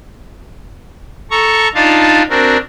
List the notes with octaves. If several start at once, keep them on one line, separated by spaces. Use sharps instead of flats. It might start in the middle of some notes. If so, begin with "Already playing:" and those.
A4 A#5 C#6
D4 D#4 F4 F5 A5
C4 D4 F#4 A#4